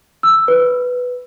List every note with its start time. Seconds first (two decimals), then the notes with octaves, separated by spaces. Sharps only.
0.23 E6
0.48 B4